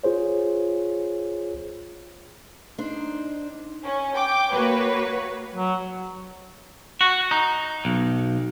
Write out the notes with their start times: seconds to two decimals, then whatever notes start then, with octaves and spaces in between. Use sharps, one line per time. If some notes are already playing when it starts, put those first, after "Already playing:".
0.04 F4 G#4 C5 C#5
2.78 D4 D#4 C5
3.84 C#4
4.15 G5 D6
4.52 A#3 F#4 B4 C#5
5.55 F#3
7.01 F#4
7.31 D#4
7.85 B1